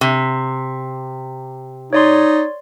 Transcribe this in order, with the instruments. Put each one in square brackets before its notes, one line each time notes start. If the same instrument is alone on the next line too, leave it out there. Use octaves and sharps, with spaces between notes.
[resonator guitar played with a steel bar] C3
[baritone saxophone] D#4 [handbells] C#5 D5 C6